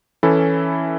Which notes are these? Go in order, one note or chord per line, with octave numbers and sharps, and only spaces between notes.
E3 C#4 E4 A4